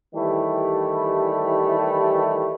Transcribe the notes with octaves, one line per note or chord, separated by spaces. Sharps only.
D#3 E3 G3 A3 E4 G4